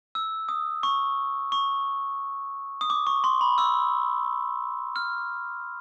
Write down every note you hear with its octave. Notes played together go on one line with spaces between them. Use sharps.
E6
D#6
C#6
C#6
D#6
D6
C#6
C6
B5
E6
F6